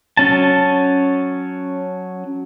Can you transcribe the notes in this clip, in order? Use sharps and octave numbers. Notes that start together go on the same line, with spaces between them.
F#3 C#4 A5